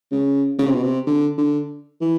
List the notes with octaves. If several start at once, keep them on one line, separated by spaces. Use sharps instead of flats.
C#3
C#3
C3
B2
C3
D3
D3
E3